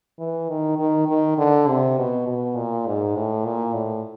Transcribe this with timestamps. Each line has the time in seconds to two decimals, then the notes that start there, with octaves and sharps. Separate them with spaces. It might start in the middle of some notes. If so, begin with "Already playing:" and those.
0.19 E3
0.50 D#3
0.78 D#3
1.08 D#3
1.38 D3
1.68 C3
1.97 B2
2.27 B2
2.56 A#2
2.86 G#2
3.16 A2
3.45 A#2
3.74 A2